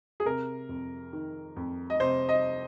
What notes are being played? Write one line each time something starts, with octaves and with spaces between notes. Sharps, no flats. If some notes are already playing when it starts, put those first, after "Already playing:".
G#4
C3 A#4
F2
D#3
F2
D#5
C3 C5
D#5